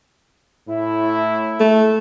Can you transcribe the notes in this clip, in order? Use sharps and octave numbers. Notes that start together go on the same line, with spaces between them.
A2 E4
A3